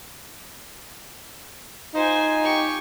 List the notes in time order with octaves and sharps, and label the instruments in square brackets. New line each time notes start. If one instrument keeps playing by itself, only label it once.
[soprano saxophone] D#4 [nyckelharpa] F4 G#5 [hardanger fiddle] C5
[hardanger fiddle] G4 C#6